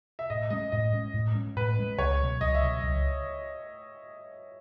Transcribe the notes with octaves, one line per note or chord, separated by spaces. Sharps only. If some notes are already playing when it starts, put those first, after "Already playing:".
E5
A2 D#5
G#3 C#4 D#5
A2 D#5
G#3 C#4
A2
G#3 C#4
A2 B4
G#3 C#4
C#2 C#5
B2 F#3
C#2 D#5
E5
B2 F#3
C#2